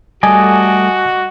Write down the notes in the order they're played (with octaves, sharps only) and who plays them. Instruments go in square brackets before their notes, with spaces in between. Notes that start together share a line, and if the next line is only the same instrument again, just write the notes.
[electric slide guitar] G3 A3 A4 [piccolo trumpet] F#4 [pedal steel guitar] D5 D#5 A5 [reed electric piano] G#5